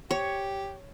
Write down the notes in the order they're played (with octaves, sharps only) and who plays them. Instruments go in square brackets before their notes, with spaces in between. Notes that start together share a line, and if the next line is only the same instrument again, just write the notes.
[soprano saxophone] G4 [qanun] C#5